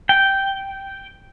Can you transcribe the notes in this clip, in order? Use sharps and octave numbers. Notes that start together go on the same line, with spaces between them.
G5